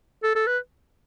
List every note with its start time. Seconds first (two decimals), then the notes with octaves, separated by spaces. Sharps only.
0.23 A4
0.35 A4
0.47 B4